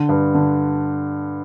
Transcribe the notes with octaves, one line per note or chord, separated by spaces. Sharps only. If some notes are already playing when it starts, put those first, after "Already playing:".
Already playing: D3
G2
D3